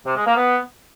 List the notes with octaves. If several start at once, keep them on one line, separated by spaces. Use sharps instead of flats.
C3
G#3
A#3
B3